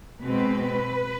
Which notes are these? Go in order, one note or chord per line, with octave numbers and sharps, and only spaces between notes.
B2 G#3 C4 B4